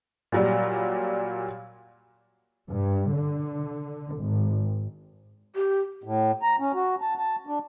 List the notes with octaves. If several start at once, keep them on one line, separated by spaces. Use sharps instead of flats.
A#2 F#3 G3
G2
D3
G#1
G4
A2
A#5
C#4
F#4
A5
A5
D4